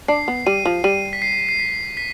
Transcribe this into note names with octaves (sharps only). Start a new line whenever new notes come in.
D4 C7
B3
G3 D#7
F3
G3 D#7
B6
C7
C7
B6
B6